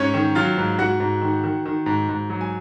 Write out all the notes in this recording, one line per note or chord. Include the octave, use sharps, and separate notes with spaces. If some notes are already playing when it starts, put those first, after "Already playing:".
Already playing: G#2 C#4 C#5
D#3
F#3 F4 F5
G#2
G#2 F#4 F#5
G#2
D#3
D#3
D#3
G#2
G#2
F#3
G#5